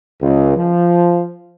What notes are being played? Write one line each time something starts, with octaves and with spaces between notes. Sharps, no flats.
C#2
F3